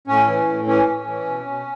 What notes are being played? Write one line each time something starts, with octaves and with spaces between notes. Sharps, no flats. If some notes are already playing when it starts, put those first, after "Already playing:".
A2 C#4
E3
A2
E3 C#4
A2
E3
B2
B2